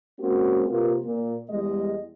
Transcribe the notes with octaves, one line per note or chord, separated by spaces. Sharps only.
G#3 A#3 C4 C#4 F#4
C3 A#3 F4 A#4 B4
A#2
E2 G3 G#3 D#5